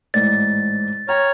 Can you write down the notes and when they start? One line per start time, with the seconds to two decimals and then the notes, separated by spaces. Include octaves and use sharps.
0.14 A1 G#2 D5 A6
1.09 C#5 G5 A#5 F6